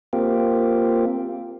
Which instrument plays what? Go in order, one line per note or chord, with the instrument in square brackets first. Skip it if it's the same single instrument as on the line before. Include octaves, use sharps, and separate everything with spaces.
[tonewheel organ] A#3 C4 F4 G4